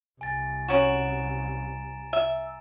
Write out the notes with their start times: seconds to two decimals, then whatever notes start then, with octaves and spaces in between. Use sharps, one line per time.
0.21 C2 G#5 A6
0.69 C#4 F#4 A#5 D7 E7
2.13 E5